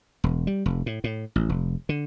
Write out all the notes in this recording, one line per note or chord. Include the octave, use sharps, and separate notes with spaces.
E1
G3
F1
A2
A2
A1
F1
D3